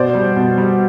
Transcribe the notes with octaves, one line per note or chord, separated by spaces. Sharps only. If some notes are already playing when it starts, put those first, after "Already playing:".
Already playing: B2 C5 D5
G3
B2
G3